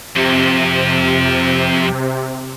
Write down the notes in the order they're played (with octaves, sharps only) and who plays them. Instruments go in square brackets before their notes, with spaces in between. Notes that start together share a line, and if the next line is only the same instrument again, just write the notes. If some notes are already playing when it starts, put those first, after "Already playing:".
[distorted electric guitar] F2 [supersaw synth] C3